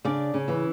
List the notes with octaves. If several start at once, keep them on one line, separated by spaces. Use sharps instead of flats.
C#3 D4 D5
C#3
E3 E4